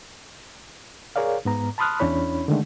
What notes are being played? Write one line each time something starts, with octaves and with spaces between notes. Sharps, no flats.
G#4 A#4 C#5 D5 F5
G#2 B3 A#5
A5 B5 C6 D#6 F6 F#6
E2 C#4 D4 E4 C#5 B5
D3 D#3 G#3 A3